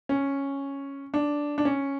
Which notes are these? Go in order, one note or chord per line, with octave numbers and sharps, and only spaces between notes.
C#4
D4
D4
C#4